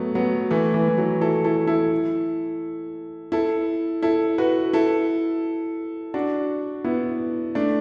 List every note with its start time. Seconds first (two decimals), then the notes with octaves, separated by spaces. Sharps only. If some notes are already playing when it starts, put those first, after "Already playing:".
Already playing: F#3 A3 B3
0.15 F#3 B3
0.51 E3 A3
0.74 E3
0.88 E3
0.98 F#3
1.21 E4 A4
1.45 E4 A4
1.67 E4 A4
3.32 E4 A4
4.02 E4 A4
4.38 F#4 B4
4.73 E4 A4
6.14 D4 F#4
6.84 B3 E4
7.55 A3 D4